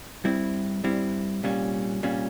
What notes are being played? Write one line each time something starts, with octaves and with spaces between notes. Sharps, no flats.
G2 G3 C4 E4
G2 G3 C4 E4
C2 A#2 G3 C#4
C2 A#2 G3 C#4